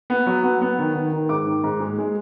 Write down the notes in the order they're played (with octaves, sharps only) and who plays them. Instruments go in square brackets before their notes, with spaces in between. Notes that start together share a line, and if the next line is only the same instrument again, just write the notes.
[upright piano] B3
F#3
B3
B3
D#3
D#3
D#3
G#2 D6
D#3
G#2
G#3
G#3